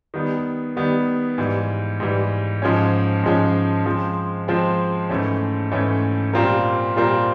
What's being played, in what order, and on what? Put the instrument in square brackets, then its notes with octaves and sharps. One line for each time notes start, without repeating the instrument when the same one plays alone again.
[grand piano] D#3 G3 B3
D#3 G3 B3
G#2 E3 G3
G#2 E3 G3
G#2 F3 G#3 C#4
G#2 F3 G#3 C#4
F3 G#3 C4
F3 G#3 C4
G#2 E3 A3 C#4
G#2 E3 A3 C#4
A#2 G3 C4 F4 A#4
A#2 G3 C4 F4 A#4